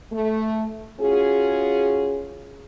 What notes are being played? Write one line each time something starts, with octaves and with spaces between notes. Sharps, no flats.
A3
C#4 F4 F#4 G#4